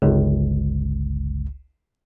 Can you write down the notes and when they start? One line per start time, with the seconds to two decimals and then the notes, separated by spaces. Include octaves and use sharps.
0.02 G1 C#2